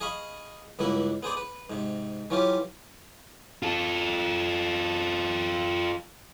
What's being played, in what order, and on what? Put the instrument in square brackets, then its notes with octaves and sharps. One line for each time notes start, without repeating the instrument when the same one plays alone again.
[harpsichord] G#4 D#5 F5 B5 C#6
C#2 G2 E3 A#3 E4 F#5
B3 G#4 C5 D5
B4
G#2 C3
E3 F#3 C#4 F4 G4
[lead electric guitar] F4 A4